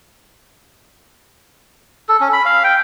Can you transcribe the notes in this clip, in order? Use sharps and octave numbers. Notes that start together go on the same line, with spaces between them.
A4
C#4
B5
F5
G5